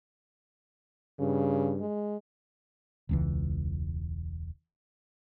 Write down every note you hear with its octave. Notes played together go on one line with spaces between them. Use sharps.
G2 C#3
G#3
E1 C#2 E3